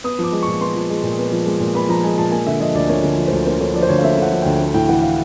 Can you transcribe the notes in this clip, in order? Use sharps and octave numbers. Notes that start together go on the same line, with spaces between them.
B3 D#6
F3 D6
G#3
A#2 C#6
B3 C6
F3
G#3
A#2
B3
F3
G#3
A#2
B3 B5
F3 A#5
G#3 G#5
A#2 A5
A#3 G#5
D3 E5
F3 D#5
D2 D5
A#3 C#5
D3
F3
D2 C5
A#3 C5
D3 C#5
F3 D5
C5
D2 C#5
F5
A#3 E5
D3 F#5
F3
D2 G5
A3
A2 G5
E3 F#5
F5